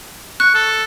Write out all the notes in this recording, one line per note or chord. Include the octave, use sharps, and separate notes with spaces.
C#6 F#6
A4